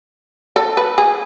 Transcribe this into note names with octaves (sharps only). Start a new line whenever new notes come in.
A4
B4
G#4